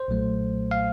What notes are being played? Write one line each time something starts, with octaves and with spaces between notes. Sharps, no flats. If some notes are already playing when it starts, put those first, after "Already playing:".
Already playing: C5
B1 A#2 F#3 A3
F5